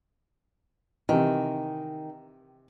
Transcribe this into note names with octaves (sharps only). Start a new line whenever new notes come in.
C3 D#3 E3